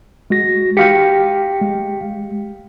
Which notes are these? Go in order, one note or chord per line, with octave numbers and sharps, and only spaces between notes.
G#3 F#4 A#6
G4 F5 G5 B6 C#7
G#3